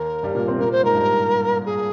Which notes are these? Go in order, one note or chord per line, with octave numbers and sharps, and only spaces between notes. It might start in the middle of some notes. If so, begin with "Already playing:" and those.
Already playing: D#2 D#3 A#4
G2 G3
A#2 A#3
C3 C4
A#2 A#3 A#4
C5
G#2 G#3 A#4
G2 G3
G#4